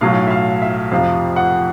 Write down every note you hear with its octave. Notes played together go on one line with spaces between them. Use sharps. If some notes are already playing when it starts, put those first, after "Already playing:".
B1 A2 F#3 F5
E5
F5
E5
F2 C3 F3 F5
F#5